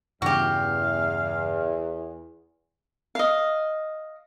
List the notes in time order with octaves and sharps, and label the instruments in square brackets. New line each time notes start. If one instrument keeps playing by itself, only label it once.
[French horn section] E2 [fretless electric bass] G2 C#3 E3 [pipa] F#4 G4 [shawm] F5
[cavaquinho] D#5 F5